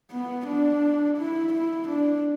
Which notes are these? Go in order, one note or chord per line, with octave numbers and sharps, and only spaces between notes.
B3
D4
E4
E4
D4